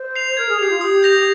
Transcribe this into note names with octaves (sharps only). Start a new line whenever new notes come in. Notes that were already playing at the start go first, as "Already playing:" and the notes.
Already playing: C5
C7 F7
A#4 G#6
G#4
G4 C7 F7
F4
G4 D#6
G6 A#6 F7